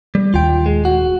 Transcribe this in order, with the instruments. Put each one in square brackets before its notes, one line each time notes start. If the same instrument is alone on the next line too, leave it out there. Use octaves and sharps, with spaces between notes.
[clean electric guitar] G3
[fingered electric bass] D#1 G#1 D#2 [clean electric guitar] F4 G5
[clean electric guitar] G#3
F#4